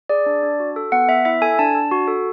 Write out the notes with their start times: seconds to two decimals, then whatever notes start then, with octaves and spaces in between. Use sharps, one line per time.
0.10 G#4 D5
0.26 D4
0.43 D4
0.60 F#4
0.76 A4
0.92 B3 F#5
1.08 B3 E5
1.25 E4 E5
1.42 A4 G#5
1.59 D4 A5
1.75 D4
1.91 F#4
2.08 A4